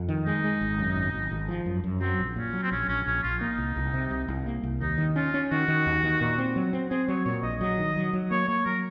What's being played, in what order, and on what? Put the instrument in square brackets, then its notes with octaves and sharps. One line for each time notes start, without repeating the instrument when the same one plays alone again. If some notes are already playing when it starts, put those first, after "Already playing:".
Already playing: [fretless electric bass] F2
D#3
[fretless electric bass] G#3 [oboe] D#4
[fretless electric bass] G#3
G#1
F#2
G#1
G#1
G#1
F3
F#2
F#2
[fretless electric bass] F#3 [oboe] C4
[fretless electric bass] A#1
[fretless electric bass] A#2 [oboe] C#4
[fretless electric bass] F#3
[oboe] C4
[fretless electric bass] A#1 [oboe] C#4
[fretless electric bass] A#1 [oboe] C#4
[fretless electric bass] A#1 [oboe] C#4
[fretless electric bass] A#1 [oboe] F4
[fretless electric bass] A#3 [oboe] D#4
[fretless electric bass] C2
C2
C3
C2
C2
A#3
C2
[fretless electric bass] D#2 [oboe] D#4
[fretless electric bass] D#3
[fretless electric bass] C#4 [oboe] F4
[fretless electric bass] C#4
[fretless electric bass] D#3 [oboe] F#4
[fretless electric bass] D#3
D#2
D#3
A#2
C4
F#3
C4
[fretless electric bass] C4 [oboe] G#4
[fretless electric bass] F#3 [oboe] C#5
[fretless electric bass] A#2 [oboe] C#5
[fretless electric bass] A#1 [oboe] D#5
[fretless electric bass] F#3 [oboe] D#5
[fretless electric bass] D#3
F#3
F#3
[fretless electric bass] A#3 [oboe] C#5
[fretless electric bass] A#3 [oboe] C#5
[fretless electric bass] F#3 [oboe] A#4